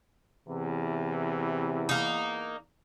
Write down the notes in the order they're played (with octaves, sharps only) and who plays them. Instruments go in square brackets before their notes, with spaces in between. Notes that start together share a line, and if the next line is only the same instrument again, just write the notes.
[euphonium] E2 [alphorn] C3 [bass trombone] E3
[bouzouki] A#3 D#4